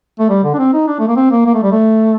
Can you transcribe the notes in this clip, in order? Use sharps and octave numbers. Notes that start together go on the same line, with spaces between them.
A3
G3
D3
D4
C4
D#4
D4
A3
A#3
C4
A#3
A#3
A3
G3
A3